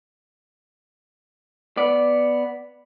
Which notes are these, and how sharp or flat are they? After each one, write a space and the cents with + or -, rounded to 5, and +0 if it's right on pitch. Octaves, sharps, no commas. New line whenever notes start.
B3 +0 D5 +0